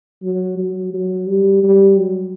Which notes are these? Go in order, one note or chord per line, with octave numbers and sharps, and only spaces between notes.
F#3
F#3
F#3
G3
G3
F#3